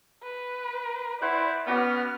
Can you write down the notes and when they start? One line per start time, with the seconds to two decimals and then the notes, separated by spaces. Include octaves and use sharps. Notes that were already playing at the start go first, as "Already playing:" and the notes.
0.23 B4
1.22 E4 B4 C5 D5 F#5
1.67 B3 C#4 F#4 D5 F6